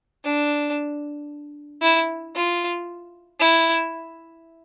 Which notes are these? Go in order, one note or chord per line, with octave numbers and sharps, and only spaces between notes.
D4
E4
F4
E4